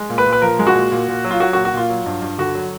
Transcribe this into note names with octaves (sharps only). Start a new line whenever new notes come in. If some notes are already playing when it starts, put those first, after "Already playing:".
Already playing: G#3
A#2
B4
A#2
B4
F3 A#4
G#3
F#4
A#2
A#2
A#2
F#3
F4
F#3 F#4
F#4
A#2
F#4
A#2 F4
F#3
G2
G2
D3 F#4
F#3